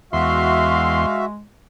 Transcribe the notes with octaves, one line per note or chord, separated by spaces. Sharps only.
E2 G#3 F#4 E5 F5 C6